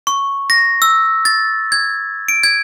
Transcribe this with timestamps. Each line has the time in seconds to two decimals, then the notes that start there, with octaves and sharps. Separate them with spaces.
0.07 C#6
0.50 A#6
0.82 E6
1.25 A6
1.72 G#6
2.28 D7
2.43 G#6